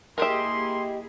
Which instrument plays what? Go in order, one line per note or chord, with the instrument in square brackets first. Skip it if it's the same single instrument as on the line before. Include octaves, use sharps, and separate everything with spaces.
[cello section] A#3 E4 G#4 [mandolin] G4 D#5 [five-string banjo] A#4 E5 [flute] C6